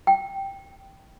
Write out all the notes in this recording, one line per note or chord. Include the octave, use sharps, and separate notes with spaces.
G5